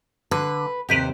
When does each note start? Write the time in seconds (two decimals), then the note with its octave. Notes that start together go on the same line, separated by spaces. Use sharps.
0.31 D3 B4
0.89 D#2 C3 G4 B4 C5